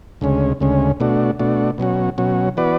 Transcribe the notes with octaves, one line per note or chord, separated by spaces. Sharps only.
D2 C#3 G#3 C#4
D2 C#3 G#3 C#4
B2 A3 D4 F#4
B2 A3 D4 F#4
B2 F#3 C#4 F#4
B2 F#3 C#4 F#4
E3 B3 F#4 B4 D5